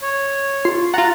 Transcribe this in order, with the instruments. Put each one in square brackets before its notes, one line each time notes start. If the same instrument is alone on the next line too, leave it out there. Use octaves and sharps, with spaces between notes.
[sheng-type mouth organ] C#5
[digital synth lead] F4 [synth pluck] C7
[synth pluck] F4 F#5 [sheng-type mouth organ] A#5 [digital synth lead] A6